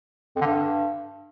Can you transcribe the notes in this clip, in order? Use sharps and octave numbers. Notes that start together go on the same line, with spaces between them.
F2
D3
G2